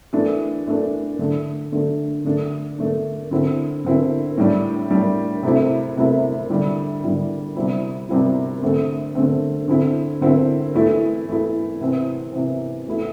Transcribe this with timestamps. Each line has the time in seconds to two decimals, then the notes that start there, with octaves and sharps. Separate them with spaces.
0.13 E3 A3 D4
0.67 E3 A3 D4
1.19 D3 A3 D4
1.72 D3 A3 D4
2.25 D3 A3 D4
2.78 D3 A3 D4
3.31 D3 C4 E4
3.85 D3 C4 E4
4.37 A2 G3 D4
4.91 A2 G3 D4
5.43 C3 A3 C4 E4
5.97 C3 A3 C4 E4
6.50 D3 G3 E4
7.03 D3 G3 E4
7.56 C3 G3 C4 E4
8.09 C3 G3 C4 E4
8.62 D3 A3 C4
9.15 D3 A3 C4
9.68 D3 C4 E4
10.21 D3 C4 E4
10.74 E3 A3 E4
11.28 E3 A3 E4
11.80 C3 E3 C4
12.33 C3 E3 C4
12.87 E3 A3 E4